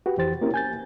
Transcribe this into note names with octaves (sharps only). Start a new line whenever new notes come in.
F#4 G4 B4
F2 E3 G4 C5 A6
A#3 C4 C#4 E4 G4 A#4
G#5 G6 A6